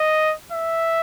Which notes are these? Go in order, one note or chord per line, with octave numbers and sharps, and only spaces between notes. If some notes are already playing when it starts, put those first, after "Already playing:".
Already playing: D#5
E5